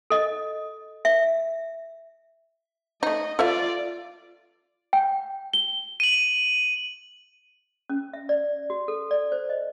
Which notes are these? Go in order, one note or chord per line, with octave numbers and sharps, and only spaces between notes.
A4 D#5
E5
A3 D#4 D#5
F4 A4 D5 E5 F5
G5
G7
D#7 F#7
C#4
E5
D5
F#4
A4
D5
C5
D#5